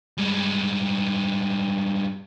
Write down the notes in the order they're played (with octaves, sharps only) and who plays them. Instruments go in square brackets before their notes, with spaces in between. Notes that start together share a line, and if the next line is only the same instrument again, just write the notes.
[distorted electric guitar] G2 G#3